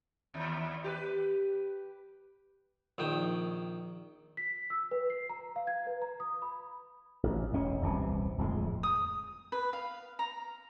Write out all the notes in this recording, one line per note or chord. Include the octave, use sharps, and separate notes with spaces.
D#2
G4 A#4 B4
A#1 D#3 G5 D#6
B6
E6
B4
C7
A#5
F5
G#6
B4
A#5
D#6
B5
A1
E1 B2 C#4
D#1 C2 C3 E3
D1 F2 G#3
D#6
B4
F5
A#5